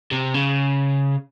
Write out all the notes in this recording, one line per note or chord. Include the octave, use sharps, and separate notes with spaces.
C3
C#3